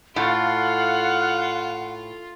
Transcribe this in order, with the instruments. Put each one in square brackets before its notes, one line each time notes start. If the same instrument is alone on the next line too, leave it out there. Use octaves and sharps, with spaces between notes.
[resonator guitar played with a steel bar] A2 [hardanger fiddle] F4 [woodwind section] F5 [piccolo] F#5